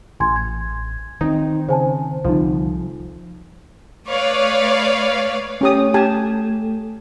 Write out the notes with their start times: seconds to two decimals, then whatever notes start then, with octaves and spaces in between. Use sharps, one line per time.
0.20 A1 G#5 C6 G#6
0.36 G#6
1.21 D#3 C4 D#4
1.69 C#3 C5 G#5 A5
2.25 C2 D3 F3 D#4 F4
4.07 A3 B4 C#5 D5 F5
5.61 A3 C#4 G4 D#6
5.94 G4 G#5 A5